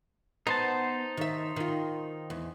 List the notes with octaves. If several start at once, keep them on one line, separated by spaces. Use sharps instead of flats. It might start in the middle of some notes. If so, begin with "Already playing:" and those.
B3 D#4 C5 A5
D#3 E5
D#3 F4
E2